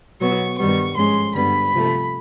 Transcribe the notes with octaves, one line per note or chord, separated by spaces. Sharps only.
B2 F#3 B3 C#6
G2 D#3 G3 B3 C#6
G#2 F3 G#3 C#4 C6
G2 D3 G3 B3 B5
C3 F3 A3